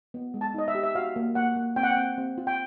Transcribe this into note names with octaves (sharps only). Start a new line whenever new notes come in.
B3
G#3
A5
D#4 D#5
E5
G4
E5
F#4 F5
A#3
A#3 F#5
A#3
C4 G5
F#5
G5
C4
C4
F4
G5